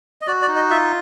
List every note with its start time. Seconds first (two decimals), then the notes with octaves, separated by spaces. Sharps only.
0.21 D#5
0.27 F#4 D5
0.42 D5
0.48 D#4
0.56 D#5
0.70 F4 E5